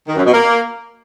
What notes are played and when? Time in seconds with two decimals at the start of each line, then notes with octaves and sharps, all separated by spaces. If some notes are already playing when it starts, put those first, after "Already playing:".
0.07 D#3
0.16 F#2
0.25 B2
0.33 A#3